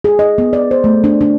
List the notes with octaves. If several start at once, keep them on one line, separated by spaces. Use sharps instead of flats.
G#4
D#5
B3
D5
C5
A3
D4
D4